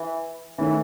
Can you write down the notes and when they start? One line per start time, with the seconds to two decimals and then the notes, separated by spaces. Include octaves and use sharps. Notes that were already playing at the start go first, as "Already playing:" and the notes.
Already playing: E3
0.58 D#3 E3 A3 C#4 E4